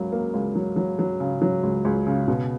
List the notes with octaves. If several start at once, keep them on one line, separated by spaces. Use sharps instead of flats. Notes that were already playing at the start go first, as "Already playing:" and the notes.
Already playing: C#2 F#3 A#3
A#3
C#2
F#3
F#3
F#3
C#3
F#3
C#2
C#2
C#3
B2